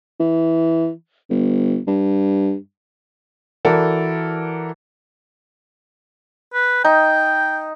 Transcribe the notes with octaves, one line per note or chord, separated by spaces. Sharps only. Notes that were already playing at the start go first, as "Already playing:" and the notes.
E3
G1
G2
E3 F#4 A4 A#4 D5
B4
D#4 G5